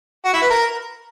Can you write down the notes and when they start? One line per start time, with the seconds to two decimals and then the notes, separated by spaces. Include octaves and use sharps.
0.25 F#4
0.33 E4
0.42 B4
0.50 A#4